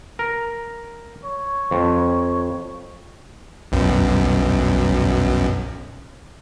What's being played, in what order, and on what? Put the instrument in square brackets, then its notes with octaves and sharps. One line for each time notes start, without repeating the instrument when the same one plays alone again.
[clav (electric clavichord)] A#4
[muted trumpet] C#5
[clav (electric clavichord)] F2
[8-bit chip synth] B1 F#2